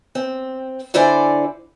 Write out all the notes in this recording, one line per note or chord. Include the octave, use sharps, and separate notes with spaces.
C4
D3 E4 C5 D5 G#5